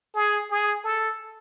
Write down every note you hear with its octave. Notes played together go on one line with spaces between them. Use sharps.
G#4
G#4
A4